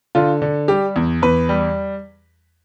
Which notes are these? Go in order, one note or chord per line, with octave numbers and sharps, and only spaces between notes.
D3 F4
D3
G3 G4
E2
E2 B4
G3